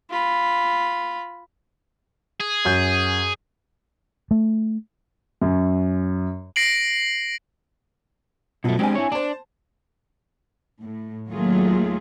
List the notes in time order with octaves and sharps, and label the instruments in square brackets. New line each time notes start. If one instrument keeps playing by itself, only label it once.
[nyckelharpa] F4 B5
[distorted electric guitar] G#4
[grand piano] F#2 F#4 G6
[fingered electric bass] A3
[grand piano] F#2
[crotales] A#6 C7 D7 F#7
[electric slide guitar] B2 A3 [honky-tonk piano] F3 F#3
[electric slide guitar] G#3 G4 [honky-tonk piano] C4 D4 G#5
[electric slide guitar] E4 C#5
[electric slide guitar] D4 [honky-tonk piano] C5 A5
[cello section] A2
D#2 F#3 A3 A#3 F4 G#4